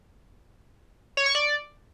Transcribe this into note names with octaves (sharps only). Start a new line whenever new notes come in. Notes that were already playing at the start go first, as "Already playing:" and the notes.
C#5
C#6
D5